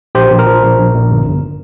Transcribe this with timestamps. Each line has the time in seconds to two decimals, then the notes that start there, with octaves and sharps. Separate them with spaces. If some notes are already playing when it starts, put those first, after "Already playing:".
0.15 A#1 G4 C5
0.31 A#1
0.39 A#4
0.47 F3
0.62 A#1
0.78 A#1
0.94 A#1
1.10 G1
1.26 G1